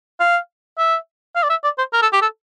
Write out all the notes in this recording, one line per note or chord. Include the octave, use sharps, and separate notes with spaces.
F5
E5
F5
D5
E5
D5
C5
A#4
A4
G4
A4